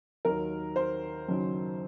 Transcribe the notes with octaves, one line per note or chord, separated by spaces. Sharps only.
D#2 D#3 F#3 A#4
C5
F#1 F#2 D#3 F#3